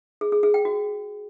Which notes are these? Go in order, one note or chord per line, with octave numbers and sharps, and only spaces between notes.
G#4
G#4
G#4
G5
F#4